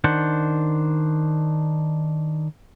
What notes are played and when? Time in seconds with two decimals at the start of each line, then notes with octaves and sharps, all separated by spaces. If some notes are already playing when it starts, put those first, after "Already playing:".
0.04 D#3 D4 C5 F#5